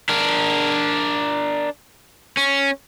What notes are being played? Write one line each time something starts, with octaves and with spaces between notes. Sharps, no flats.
D4 A#4
C#4